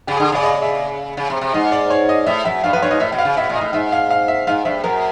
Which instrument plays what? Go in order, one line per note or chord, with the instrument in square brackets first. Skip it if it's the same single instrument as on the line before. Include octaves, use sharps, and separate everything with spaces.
[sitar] C#3 [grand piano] G4
[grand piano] G#4
[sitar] D3
[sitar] C#3 [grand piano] D5
[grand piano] D#5
E5
[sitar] C#3
C3
C3
[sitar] G#2 [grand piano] D#5
[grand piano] D5
C#5
D#5
[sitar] A2 [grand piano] E5
[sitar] F#2 [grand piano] E5
[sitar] G2 [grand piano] F5
[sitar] F#2 [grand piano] B4
[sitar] G2 [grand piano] C#5
[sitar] G#2 [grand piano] D#5
[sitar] A2 [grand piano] E5
[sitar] B2
[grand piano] F5
[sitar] C#3
[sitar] B2 [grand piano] E5
[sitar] A#2
[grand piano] D#5
[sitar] A2
[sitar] G#2 [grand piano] E5
[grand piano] F5
F5
E5
[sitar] G#2 [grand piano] F5
[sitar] G2 [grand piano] E5
[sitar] F#2 [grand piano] A#4